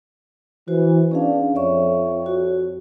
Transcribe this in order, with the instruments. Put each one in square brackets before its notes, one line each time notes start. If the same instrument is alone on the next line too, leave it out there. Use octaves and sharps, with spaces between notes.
[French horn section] E3 [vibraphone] F#4 C5
[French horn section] B3 D4 B4 [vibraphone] C#4 G#4 F5
[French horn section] F2 C#5 [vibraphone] D5 E5 C#6
[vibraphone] F#4